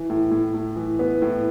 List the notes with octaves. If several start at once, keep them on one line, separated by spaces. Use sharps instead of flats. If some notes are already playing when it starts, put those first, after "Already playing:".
Already playing: E3
A2
A2
A2
E3
B3
A2